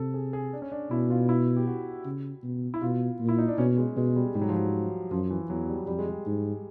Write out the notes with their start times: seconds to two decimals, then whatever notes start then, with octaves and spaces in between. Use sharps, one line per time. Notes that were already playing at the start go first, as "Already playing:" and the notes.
Already playing: C3 A4
0.14 G#4
0.33 G#4
0.53 D4
0.62 C#4
0.72 D4
0.91 B2 E4
1.10 F4
1.29 E4
1.56 G4
1.67 F#4
2.05 C#3
2.43 B2
2.74 E4
2.82 B2 F4
3.20 A#2
3.29 E4
3.38 D#4
3.48 D4
3.58 B2 C#4
3.78 G#3
3.97 B2 G#3
4.16 G3
4.35 G#2 G3
4.41 F#3
4.49 F3
4.56 F#3
5.11 F#2 F3
5.30 E3
5.50 E2 F#3
5.69 G3
5.87 F2 G3
5.99 G#3
6.09 G3
6.26 G#2